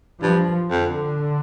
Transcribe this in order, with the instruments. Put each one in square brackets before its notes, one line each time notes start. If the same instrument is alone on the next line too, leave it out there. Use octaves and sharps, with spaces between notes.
[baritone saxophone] G2 [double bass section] F3
[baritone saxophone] F2 [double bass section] D3